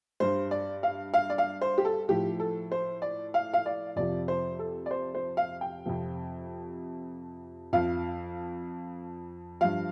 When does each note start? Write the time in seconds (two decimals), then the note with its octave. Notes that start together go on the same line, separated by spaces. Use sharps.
0.20 G2 G3 C5
0.51 D5
0.83 F5
1.14 F5
1.30 D5
1.38 F5
1.62 C5
1.78 G4
1.85 A4
2.08 A2 F3 G4
2.40 A4
2.72 C5
3.02 D5
3.34 F5
3.54 F5
3.66 D5
3.96 F2 C3 F3 D5
4.28 C5
4.59 A4
4.86 D5
4.91 C5
5.15 C5
5.37 F5
5.61 G5
5.85 F2 C3 F3
7.73 F2 F3 F5
9.61 G2 F3 F5